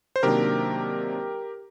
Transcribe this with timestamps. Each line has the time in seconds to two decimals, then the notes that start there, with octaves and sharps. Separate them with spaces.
0.16 C5
0.23 C3 D#3 F#3 A#3 D4 G4 A#4